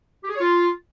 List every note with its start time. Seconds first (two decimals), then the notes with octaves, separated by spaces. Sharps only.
0.24 G4
0.29 G#4
0.35 C#5
0.40 F4